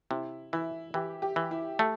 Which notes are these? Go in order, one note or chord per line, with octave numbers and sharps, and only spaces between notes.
C3 E4
E3 E4
E3 G4
G4
E3
E4
A3 G4